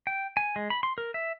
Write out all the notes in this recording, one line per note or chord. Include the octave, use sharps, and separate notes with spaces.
G5
G#5
G#3
B5
C6
A#4
E5